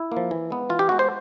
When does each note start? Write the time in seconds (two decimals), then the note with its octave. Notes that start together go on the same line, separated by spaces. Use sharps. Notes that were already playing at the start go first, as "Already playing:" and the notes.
Already playing: E4
0.12 F3 A#3
0.31 E3
0.50 G#3 B3
0.69 E3 F4
0.79 G4
0.89 G#3 B3 F#4
0.99 C5